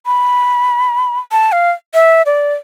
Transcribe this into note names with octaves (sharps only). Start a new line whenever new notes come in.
B5
A5
F5
E5
D5